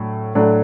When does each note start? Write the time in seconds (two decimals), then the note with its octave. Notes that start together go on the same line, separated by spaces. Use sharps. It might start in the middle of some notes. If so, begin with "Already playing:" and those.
Already playing: A2 F#3 D4
0.35 A2 F#3 A3 D4